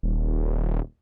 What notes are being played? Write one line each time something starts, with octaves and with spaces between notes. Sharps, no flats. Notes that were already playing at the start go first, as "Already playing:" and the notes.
D#1